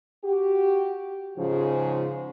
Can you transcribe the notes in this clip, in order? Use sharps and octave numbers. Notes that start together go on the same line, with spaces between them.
F#4 G4
G#2 C#3 F3